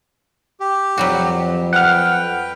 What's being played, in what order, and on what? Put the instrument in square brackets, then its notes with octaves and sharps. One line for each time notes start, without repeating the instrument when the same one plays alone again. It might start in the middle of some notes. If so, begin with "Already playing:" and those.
[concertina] G4
[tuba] F2 [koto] F#3 G3 F#4
[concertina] B4 G5 [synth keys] F#5 F6